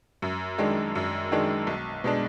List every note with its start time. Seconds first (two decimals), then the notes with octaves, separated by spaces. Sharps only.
0.22 F#2
0.58 D#3 G#3 D4
0.95 F#2
1.32 D#3 G#3 D4
1.67 B1
2.04 B2 G#3 D4